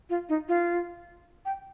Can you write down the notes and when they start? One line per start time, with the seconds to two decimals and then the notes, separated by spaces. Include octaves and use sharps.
0.10 F4
0.29 D#4
0.49 F4
1.45 G5